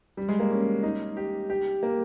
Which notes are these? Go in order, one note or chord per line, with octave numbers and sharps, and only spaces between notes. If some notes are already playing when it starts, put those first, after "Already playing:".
G3
G#3
A#3
C#4
D#4
G4
G4
A#3